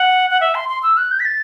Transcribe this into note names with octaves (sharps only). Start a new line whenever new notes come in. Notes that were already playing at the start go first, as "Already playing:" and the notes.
Already playing: F#5
F#5
E5
C6
C6
E6
F#6
G6
B6
A6